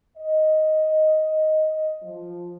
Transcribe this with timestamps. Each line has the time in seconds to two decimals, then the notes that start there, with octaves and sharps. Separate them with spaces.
0.17 D#5
2.02 F3